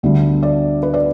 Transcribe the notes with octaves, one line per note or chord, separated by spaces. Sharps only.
D2 D3 G3 B3
D5
B4
D5